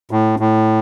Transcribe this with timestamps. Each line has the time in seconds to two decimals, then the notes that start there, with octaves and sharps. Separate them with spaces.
0.11 A2
0.39 A2